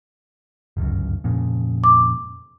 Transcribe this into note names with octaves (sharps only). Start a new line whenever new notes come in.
G1 C#2 F#2
F2 A#2 C#3
D6